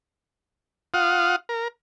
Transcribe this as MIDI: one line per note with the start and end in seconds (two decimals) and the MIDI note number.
0.94 1.36 65
0.94 1.36 77
0.94 1.36 78
0.94 1.36 87
1.49 1.68 70